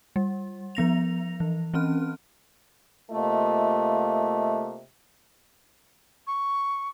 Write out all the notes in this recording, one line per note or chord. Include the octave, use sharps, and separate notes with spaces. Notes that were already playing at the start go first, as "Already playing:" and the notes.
G3
F3 B3 A#6 F7
E3
E3 C4 C#4 F6
C3 A3 A#3 F4 D#5
C#6